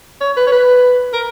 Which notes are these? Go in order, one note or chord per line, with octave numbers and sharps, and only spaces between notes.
C#5
B4
C#5
B4
A#4